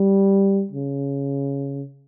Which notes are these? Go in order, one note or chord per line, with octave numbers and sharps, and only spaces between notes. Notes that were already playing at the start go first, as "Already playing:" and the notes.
Already playing: G3
C#3